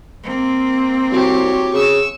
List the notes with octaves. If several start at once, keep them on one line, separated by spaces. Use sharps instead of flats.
A#3 C4
C2 F#4 G4 C#5
C#3 C#6 E6